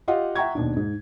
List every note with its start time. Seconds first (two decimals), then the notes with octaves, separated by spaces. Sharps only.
0.08 F4 G4 D#5 F5 F#5
0.35 E5 F#5 G5 A#5 C#6 G#6
0.55 D#2 B2 D4
0.76 G#2